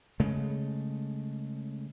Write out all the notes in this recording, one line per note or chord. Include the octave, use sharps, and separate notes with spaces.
C#3 G#3 A3